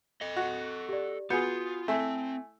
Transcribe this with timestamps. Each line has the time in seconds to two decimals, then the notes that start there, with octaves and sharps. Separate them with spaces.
0.21 A4 D#5
0.36 F#4
0.89 G4 D5
1.30 B3 F4 F#4 G#4 G6 C#7
1.88 A3 C4 E4 G#5